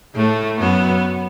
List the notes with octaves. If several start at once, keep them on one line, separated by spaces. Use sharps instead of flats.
A2 A3
F#2 B3